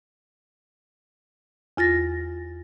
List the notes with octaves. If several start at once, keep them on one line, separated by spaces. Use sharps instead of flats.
E2 F4 A6 A#6